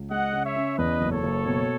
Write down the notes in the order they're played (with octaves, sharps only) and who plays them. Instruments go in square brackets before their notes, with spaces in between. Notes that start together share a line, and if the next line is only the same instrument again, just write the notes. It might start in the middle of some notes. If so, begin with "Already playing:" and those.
Already playing: [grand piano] C#2
[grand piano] G#3 [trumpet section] D#5 F#5
[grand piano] C#3
[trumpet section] C#5 E5
[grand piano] C#4
[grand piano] E2 [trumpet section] B4 D#5
[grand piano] F#1
[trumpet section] A4 C#5
[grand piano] F#1
B2